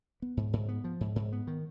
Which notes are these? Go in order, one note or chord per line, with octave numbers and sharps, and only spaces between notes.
B3
G#2
G#2
B3
F3
G#2
G#2
B3
D#3